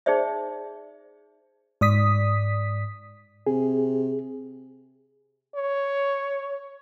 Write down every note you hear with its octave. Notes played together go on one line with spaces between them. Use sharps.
D#4 G#4 C5 D5 E5
G#2 D5 D#6 B6
C3 G#4
C#5